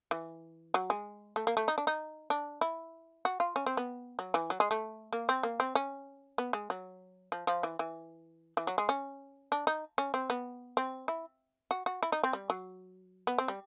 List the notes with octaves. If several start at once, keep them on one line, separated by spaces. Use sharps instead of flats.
E3
F#3
G#3
A3
A#3
A3
D#4
D4
D#4
D4
E4
F#4
F4
C#4
C4
B3
F#3
E3
F#3
G#3
A3
A#3
C4
A#3
C4
C#4
B3
G#3
F#3
F3
F3
E3
E3
E3
F#3
G#3
C#4
D4
D#4
C#4
C4
B3
C4
E4
F#4
F#4
E4
D#4
C4
G3
F#3
B3
C4
G3